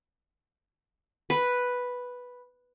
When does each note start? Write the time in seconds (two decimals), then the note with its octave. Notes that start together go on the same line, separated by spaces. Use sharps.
1.30 B4